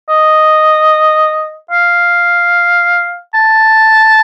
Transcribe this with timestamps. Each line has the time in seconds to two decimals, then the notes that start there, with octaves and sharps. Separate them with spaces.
0.09 D#5
1.71 F5
3.34 A5